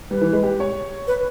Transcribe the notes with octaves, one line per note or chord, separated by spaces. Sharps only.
G3 B4
E3
G#3
G4
C#5
B4